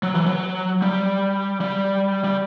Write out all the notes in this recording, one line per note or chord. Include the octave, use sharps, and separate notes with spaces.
F#3
E3
F#3
G3
G3
G3